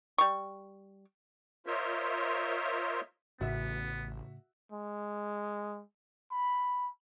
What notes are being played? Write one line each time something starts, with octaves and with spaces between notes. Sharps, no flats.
G3 C#6
F4 A#4 C5 C#5 D#5 E5
A1 A2 C#3 B3 F#4 E5
G#3
B5